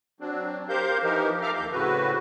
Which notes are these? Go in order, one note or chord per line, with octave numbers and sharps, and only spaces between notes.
F#3 C4 D4
G4 A#4 C5 F5 G6
E3 F3 D#4 G4 A#4
A4 E5 F5 A#5 D6 F6
D#2 G6
A2 C#3 C4 F#4 B4